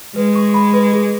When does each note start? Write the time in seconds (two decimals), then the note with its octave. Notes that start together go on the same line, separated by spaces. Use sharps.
0.16 G#3 B4
0.35 C#6
0.54 B5
0.73 B4
0.92 G#4